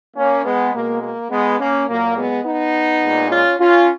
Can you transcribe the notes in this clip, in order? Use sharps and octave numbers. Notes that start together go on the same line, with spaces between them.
A#3 C#4
G#3 B3
B2 G#3 A#3
A#3
G#3 B3
A#3 C#4
A#2 F#3 A#3
G#3 B3
B3 D#4
A#2 G#3
C#4 F4
C#4 F4